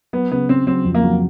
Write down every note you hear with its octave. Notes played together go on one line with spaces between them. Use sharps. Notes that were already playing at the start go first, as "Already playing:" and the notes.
F#3 B3
C#3 B3
C#3 C4
F#3 C4
F2
A#3
F#3